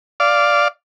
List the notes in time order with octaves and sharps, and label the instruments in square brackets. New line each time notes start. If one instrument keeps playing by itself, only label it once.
[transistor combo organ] D5 F5